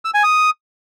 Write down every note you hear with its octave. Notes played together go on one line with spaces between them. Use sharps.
E6
G#5
D#6